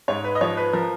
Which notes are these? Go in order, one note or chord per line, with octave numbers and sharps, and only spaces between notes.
G#2 C#5
B4
D#5
F3 C#5
B4
F3 A#4